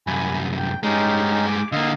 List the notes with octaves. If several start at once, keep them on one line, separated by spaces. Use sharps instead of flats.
C2 F#2 G#5 B5
G5
G2 G#3 C#4 D#4 G4
D6
D3 A#3 D#5 F5 E6